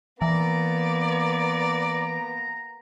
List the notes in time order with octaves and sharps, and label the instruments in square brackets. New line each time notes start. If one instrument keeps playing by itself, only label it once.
[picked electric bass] E3 [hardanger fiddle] A#3 B3 [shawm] D5 [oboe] A#5